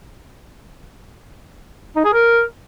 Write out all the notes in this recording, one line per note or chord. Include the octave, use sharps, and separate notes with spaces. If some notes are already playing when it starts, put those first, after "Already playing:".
D#4
G#4
A#4